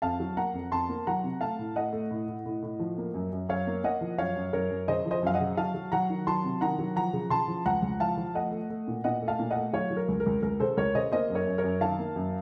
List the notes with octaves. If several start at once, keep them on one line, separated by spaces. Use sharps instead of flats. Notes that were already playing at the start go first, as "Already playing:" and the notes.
F2 F5 A5
F#3
A#3 F#5 A#5
F2
F2 A5 C6
A#3
F#3 F#5 A#5
C3
A3 F5 A5
A2
A3 D#5 F#5
A3
A2
A2
A2
A2
F3
A#3
F#2
F#2
F#2 C#5 F5
A#3
A#3 D#5 F#5
F3
F#2 C#5 F5
F#2
F#2 A#4 C#5
F#2
C#3 C5 D#5
F3
C5 D#5
F#2 F5
D#5 F#5
C#3
F#3 F5 A5
F#3
F#3 F#5 A#5
D#3
F#3 A5 C6
C3
D#3 F#5 A#5
F#3
F3 F#5 A#5
C#3
C#3 A5 C6
F3
C#2 F#5 A#5
C#2
F3 F5 A5
F3
A3 D#5 F#5
A3
A3
A#2
A#2 D#5 F#5
A3
F5 A5
A#2
D#5 F#5
A3
F#3 C#5 F5
F#3
A#4
C#2
A#4
C#2
C#2 A#4
C#3 A4 C5
C#2 A#4 C#5
C#3 C5 D#5
A#3 C5 D#5
F#2
A#4 C#5
F#2
A#4 C#5
F#2
D#3 F5 A5
A#3
F#2